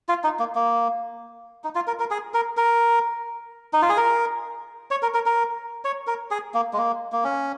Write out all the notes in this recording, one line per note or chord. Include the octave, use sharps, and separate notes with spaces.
F4
D#4
A#3
A#3
D#4
F4
A#4
A#4
G#4
A#4
A#4
D#4
F4
G#4
A#4
C#5
A#4
A#4
A#4
C#5
A#4
G#4
A#3
G#3
A#3
A#3
C#4